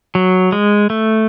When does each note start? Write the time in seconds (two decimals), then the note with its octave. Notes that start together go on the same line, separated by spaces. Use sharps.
0.15 F#3
0.52 G#3
0.90 A3